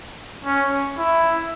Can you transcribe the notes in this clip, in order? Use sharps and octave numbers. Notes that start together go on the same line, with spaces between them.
C#4
E4